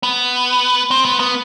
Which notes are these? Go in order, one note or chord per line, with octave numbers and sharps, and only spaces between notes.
B3
C4
B3
B3